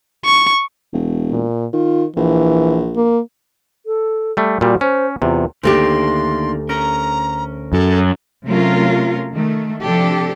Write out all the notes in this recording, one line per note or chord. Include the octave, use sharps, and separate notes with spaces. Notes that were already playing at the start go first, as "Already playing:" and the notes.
C#6
E1
A#2
D#3 F4
A#1 E3
A#3
A4
G3 A3
A#2 G3 F#4
C#4 C5
E2 C3 F4
D2 D#3 A3 A#3 D4 G4 C6
C#4 A#4 A#5
F#2 A4
C3 F#3 A3 C#4 F4 A#4
D#3 A3
C3 F3 D4 G4 A4